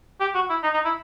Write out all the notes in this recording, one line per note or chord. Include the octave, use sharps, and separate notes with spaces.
G4
F#4
E4
D#4
D#4
E4